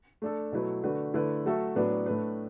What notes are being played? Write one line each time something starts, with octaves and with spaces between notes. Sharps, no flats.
A3 D4 A4
B2 F#3 A3 E4 B4
D3 A3 D4 F#4 B4
D3 A3 E4 B4 D5
F#3 A3 F#4 A4 E5
A2 F#3 B3 D4 B4
A2 A3 D4 B4